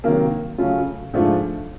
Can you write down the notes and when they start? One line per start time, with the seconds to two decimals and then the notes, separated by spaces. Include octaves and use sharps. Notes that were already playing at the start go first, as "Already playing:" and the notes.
0.04 C3 D#3 F#3 A#3
0.58 C#3 F#3 A3 C#4 F4
1.14 G#2 F3 A3 D4 F4